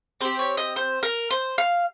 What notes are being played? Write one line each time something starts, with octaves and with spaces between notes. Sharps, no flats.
C4 G4 C5
C#5
D#5
C5
A#4
C5
F5